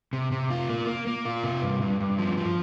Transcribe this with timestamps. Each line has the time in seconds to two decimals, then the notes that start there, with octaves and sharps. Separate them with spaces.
0.13 C3
0.32 C3
0.50 F4
0.69 A#3
0.87 A#3
1.07 A#3
1.25 F4
1.43 C3
1.62 G2
1.82 G2
2.00 G2
2.18 F3
2.37 F3